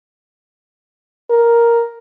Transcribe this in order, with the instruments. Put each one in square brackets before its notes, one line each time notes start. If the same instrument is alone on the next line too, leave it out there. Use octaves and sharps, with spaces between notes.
[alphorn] A#4